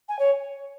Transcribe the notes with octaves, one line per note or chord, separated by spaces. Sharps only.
G#5
C#5